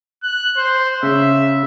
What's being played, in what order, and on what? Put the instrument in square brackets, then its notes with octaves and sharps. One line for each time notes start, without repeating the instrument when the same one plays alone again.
[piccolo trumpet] F#6
C5
[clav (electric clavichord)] C#3 [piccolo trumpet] E5